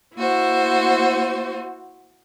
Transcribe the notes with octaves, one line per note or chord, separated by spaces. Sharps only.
A#3 E4 F#4 C5